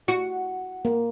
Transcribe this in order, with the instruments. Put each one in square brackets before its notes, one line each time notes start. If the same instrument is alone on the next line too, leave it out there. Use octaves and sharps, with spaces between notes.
[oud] F#4
[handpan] A#3